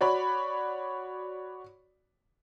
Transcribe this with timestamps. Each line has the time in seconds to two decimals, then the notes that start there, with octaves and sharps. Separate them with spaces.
0.01 F#4 C#5 D5 B5